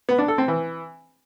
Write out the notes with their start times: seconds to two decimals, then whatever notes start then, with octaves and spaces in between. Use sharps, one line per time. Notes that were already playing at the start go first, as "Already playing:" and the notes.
0.09 B3
0.18 D4
0.28 A4
0.38 C4
0.48 E3